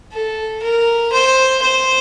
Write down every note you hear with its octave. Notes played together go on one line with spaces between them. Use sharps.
A4
A#4
C5
C5